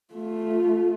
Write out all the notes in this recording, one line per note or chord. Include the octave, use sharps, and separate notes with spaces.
A3 F4